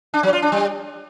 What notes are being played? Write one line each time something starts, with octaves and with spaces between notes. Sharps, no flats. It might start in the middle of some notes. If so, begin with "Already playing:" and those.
D4
F#3
F4
D4
G3